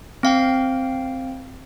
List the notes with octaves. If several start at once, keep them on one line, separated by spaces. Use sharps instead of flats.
C4 F5 G5